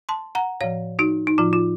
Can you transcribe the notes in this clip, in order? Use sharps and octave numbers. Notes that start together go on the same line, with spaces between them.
A5 C6
F#5 A#5
A2 F3 C#5 F5
D#4 F#4
D#4
A2 F3 F4
F4